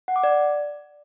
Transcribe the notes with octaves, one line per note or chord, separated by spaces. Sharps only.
F#5
D6
D5